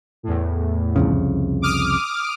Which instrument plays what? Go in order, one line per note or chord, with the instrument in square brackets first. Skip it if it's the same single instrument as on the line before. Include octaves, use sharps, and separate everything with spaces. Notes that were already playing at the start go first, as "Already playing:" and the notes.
[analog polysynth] E2 A2
[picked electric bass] C2 F2 C#3
[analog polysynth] D6 D#6 F6